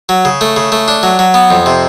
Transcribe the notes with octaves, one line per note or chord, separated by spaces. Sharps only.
F#3
C#3
A3
C#3
A3
D4
F#3
F#3
B3
F2
C3